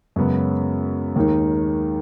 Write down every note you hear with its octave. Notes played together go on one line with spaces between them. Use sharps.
F#2 C#3 G#3 B3
D#2 D#3 G#3 D#4